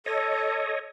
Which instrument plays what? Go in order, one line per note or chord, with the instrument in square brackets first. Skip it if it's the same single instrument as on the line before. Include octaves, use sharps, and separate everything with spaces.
[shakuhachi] A4 [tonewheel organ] C#5 D#5